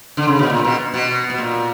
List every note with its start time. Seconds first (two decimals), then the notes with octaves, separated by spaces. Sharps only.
0.17 D3
0.28 C#3
0.39 B2
0.50 A#2
0.65 B2
0.94 B2
1.30 B2
1.38 A#2